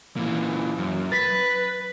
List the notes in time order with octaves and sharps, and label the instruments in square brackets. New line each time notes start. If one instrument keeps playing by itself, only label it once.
[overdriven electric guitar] A#2 E3
F#2
[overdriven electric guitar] B4 [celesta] A6 B6